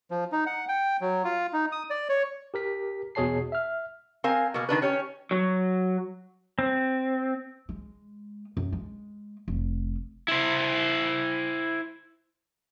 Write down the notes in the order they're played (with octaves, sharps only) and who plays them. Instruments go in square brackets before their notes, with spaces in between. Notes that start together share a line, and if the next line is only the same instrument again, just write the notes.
[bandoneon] F3
D#4
F#5
G5
F#3
F4
D#4
D#6
D5
C#5
[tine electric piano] G4 A#4 B6
E2 B2 G#4 C#5 A5 C7
E5 F6
[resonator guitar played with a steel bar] C4 A#4 F5 G#5
B2 A#3
D#3 D4 B4
C#4 G4 C#5
[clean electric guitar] F#3
[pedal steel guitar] C4
[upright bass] G#3
F#2
G#3
F1
[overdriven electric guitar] E4 C5